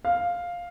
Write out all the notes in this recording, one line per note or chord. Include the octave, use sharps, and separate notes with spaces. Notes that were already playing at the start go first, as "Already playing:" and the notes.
F5